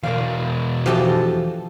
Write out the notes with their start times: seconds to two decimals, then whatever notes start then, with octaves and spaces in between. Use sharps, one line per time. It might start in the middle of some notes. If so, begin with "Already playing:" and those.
0.03 E2 B2 A#4 D5 F5
0.86 E3 F3 F#4 G4 A4